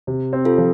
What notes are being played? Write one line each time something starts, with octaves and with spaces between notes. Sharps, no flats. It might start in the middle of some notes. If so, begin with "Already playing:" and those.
C3
C4
F4 A4
F3